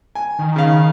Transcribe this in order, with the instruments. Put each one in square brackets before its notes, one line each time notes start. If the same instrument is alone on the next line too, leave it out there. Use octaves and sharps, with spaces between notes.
[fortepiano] G#5
[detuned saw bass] D#3
[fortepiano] C#3 F5